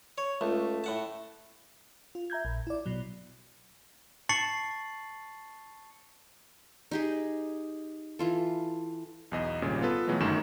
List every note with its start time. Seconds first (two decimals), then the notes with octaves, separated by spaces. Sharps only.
0.18 C#5
0.41 C#2 A3
0.84 A2 F#5 A5
2.15 F4
2.30 E5 A#5 G6 G#6
2.45 A#1
2.67 E4 D5
2.86 B2 F#3
4.29 A5 C#6 A6 C7 C#7 F#7
6.91 D#4 G4 G#4
8.19 E3 F4 A4
9.31 B1 E2 D#5
9.62 G#1 A#2 C#3 G3
9.81 B3 F4 A4 B4
10.07 B2 E3 F#3 G#3 A3
10.20 G1 F#2 D#3 A3 F#4 E7